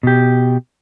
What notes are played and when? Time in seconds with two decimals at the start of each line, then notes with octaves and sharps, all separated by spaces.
0.03 B2 G4